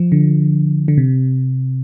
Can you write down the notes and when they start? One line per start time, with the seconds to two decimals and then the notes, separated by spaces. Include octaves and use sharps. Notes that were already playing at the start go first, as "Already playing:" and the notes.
Already playing: F3
0.12 D3
0.88 D3
0.98 C3